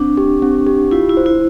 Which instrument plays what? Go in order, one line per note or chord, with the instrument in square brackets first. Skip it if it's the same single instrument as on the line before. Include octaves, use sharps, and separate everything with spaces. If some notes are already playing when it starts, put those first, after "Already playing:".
Already playing: [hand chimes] C4 [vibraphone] D4
[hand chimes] G4
C4
G4
[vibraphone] E4 [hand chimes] F4
[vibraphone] E4
[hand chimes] C5
[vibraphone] E4